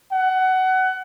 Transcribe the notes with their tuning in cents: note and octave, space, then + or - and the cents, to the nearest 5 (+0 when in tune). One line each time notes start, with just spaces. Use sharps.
F#5 +20